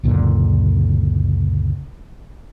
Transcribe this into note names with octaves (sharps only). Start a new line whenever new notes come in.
C#2 F#2 A#2 D3